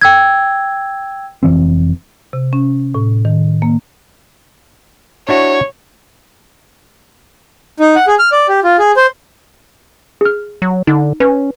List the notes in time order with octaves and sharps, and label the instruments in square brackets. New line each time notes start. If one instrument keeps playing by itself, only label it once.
[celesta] G5 E6 G#6
[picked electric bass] F1 E3 C4
[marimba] C3
C#4
A2
D#3
A#3
[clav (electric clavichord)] D4 E4 F#4 [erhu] C#5
[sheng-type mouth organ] D#4
F#5
G#4
F6
D5
G4
F4
G#4
C5
[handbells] G#4 F6
[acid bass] F#3
[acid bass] D3 [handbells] D#4
[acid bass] C#4 [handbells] B4